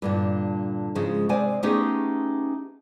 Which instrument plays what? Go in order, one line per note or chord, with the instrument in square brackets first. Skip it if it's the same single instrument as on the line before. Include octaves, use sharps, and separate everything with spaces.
[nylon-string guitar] G2 A#2 D3
G#2 C#3 F3 G#3
C3 G#3 C5 D5 G#5
A3 B3 C#4 D#4 G4 G#4